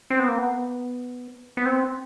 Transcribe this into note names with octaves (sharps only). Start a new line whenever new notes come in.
C4
B3
A#3
B3
B3
C4